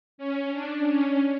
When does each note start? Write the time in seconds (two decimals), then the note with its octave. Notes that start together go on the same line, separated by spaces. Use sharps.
0.18 C#4
0.53 D4
0.87 C#4